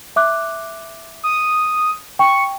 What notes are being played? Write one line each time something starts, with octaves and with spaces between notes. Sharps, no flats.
E5 D6 F#6
D#6
G5 C#6